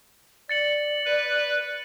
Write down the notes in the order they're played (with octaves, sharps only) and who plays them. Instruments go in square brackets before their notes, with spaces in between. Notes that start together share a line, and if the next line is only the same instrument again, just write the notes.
[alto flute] D5 [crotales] A6 C#7 F#7
[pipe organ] B4